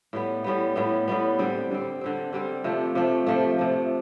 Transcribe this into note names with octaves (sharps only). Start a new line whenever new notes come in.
A2 G3 B3
A2 G3 B3
A2 G3 B3
A2 G3 B3
D3 G3 C4
D3 G3 C4
D3 G3 C4
D3 G3 C4
C3 F3 A3
C3 F3 A3
C3 F3 A3
C3 F3 A3